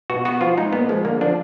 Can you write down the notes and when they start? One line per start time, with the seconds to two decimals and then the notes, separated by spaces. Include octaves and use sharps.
0.10 B2 F#4
0.25 B3 F#4
0.41 F3 F4
0.57 G#3 D#4
0.73 A#2 B3
0.89 F3 G#3
1.05 D3 A#3
1.21 F3 D4